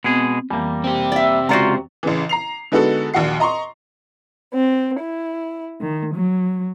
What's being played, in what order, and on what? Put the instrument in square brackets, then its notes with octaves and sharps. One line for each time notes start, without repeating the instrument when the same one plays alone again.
[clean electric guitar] B2 G#3 G#4 [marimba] B3 C4
[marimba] F2 E3 [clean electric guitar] G3 A#3
[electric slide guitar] C4 G4
[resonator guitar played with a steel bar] D5 E5
[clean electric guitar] C#2 F4 C5 [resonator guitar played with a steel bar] F#4 D5 A#5
[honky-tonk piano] A1 C#3 E3
A#5 C7 F7
D3 G#3 B3 D#4 F#4 A4
A#1 D#2 F#4 F#5 C7
D#5 A#5 C6 C#6
[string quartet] C4
E4
D#3
F#3